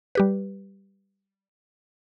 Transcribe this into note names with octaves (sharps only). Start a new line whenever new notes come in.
G3 G4 B4